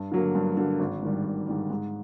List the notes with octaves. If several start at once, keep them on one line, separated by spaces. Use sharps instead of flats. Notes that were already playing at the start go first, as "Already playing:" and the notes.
Already playing: G2
D3 F#3 A#3
G2
D3 F#3 A#3
G#1
G#2 D#3 G3
G#1
G#2 D#3 G3
G#2